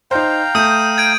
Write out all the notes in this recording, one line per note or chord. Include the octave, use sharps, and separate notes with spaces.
D#4 C5 F5 G5 A#5
A3 D#6 G6 D#7
G#6 D7 D#7